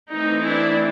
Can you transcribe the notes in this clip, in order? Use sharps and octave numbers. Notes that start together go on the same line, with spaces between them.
E3 A3 C4 D#4
D4 E4